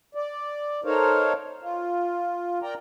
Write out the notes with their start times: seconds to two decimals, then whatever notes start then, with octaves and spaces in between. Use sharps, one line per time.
0.15 D5
0.84 D#4 A4 A#4 C5 C#5 F5
1.62 F4
2.62 A#4 D5 G5 A#5